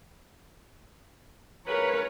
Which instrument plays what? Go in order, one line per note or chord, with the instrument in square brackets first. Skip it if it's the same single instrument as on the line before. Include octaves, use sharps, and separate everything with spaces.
[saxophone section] G#2 C#3 B4 [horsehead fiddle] A#4 C#5